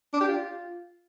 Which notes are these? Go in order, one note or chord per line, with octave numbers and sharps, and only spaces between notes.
D4
G4
F4